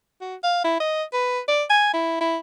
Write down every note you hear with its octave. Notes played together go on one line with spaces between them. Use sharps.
F#4
F5
E4
D#5
B4
D5
G#5
E4
E4